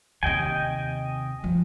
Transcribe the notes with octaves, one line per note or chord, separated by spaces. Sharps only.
D#2 C3 D#5 G5 G#5
F3 G3